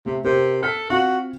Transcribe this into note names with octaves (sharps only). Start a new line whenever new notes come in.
C3 A3
C3 A#4 C5
A4 F6 B6
C4 F4 F#4 F5